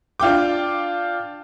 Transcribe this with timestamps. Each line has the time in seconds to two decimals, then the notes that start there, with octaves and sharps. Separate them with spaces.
0.20 D4 F4 G5 D6